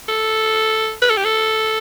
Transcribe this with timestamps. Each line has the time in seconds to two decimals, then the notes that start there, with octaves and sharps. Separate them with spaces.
0.09 A4
1.02 B4
1.10 A4
1.17 G4
1.25 A4